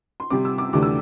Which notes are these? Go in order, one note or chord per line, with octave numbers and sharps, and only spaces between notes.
C6
C3 G3 C4 D6
E6
D6
D2 C3 E3 A3 D4 D6
E6